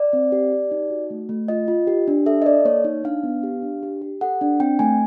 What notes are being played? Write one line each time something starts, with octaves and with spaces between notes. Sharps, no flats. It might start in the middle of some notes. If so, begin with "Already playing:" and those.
Already playing: D5
C4
G4
G4
D#4
F#4
A3
A3
F4 D#5
F4
G4
D4
A4 E5
D#5
A4 D5
A#3 C#5
D#4
D4 F5
B3
G4
D4
G4
G4
A4 F#5
D4
C4 G5
A3 G#5